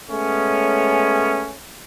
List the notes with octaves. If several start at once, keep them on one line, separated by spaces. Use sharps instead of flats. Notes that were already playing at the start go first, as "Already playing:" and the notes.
G#3 A3 B3 C#4